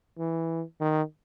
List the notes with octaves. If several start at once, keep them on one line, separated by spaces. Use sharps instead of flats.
E3
D#3